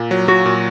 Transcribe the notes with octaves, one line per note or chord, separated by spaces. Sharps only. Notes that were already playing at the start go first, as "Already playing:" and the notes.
Already playing: A#2
F#3
F#3 F#4
A#2